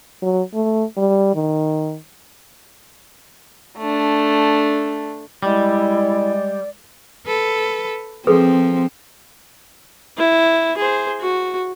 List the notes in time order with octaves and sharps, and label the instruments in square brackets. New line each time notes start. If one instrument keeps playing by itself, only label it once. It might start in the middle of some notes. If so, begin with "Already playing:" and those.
[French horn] F#3
A3
G3
D#3
[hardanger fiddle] A3 D4
[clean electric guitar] G3 [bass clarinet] G#3 [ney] E4 [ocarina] D5
[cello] A4 B4
[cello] F3 [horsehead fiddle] C4 [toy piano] G#4 A4 B4
[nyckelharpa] E4
G#4 C5
F#4